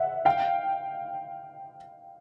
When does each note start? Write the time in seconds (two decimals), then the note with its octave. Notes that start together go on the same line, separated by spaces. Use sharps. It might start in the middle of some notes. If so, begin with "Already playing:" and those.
Already playing: E5 F#5
0.25 F5 G5